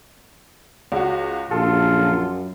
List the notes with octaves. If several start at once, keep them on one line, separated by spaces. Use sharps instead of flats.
C#2 F#4
A#1 F#2 F4 A4